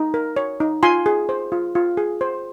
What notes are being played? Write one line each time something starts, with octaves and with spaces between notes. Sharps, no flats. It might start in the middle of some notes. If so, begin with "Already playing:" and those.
Already playing: D#4
A#4
C#5
D#4
F4 G#5 C6
G#4
C5
F4
F4
G#4
C5